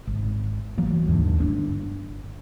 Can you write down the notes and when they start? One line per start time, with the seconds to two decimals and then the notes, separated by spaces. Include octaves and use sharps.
0.07 G#1
0.78 E3 F#3 A#3
1.08 D#2 G#2 D3 E3
1.38 G1 C4 D4